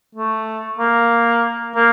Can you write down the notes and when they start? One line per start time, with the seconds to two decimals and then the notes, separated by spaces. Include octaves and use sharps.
0.15 A3
0.79 A#3
1.75 A#3